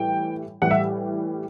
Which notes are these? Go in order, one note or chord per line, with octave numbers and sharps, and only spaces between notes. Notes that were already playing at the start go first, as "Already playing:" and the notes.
Already playing: A2 E3 G3 G5
A2 E3 G3 F#5
E5